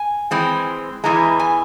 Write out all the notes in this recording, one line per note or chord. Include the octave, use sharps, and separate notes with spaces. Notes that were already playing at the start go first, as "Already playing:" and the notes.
Already playing: G#5
E3 G#3 C4
E2 E3 G#3 A#5
G#5